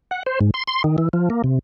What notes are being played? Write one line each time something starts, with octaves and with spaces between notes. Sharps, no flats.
F#5
C5
G#2
C6
C6
D#3
E3
F3
A#3
C3